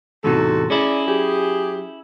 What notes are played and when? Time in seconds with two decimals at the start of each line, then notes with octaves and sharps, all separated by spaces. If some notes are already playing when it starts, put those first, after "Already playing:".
0.24 E2 A2 C3 D#4 F#4 A4
0.70 C#4 E4 G#4 D5
1.07 F#3 G4 G#4